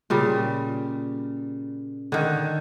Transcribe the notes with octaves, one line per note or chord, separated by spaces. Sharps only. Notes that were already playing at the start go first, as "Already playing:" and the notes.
A#2 C#3 G3
D3 D#3